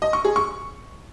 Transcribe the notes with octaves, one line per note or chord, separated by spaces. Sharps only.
D#5
C#6
G#4
C#6